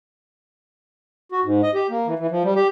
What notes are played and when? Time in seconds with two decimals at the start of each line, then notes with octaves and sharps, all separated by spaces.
1.32 F#4
1.44 G#2
1.63 D#5
1.74 G4
1.90 A#3
2.07 E3
2.19 E3
2.31 F3
2.44 G3
2.55 G4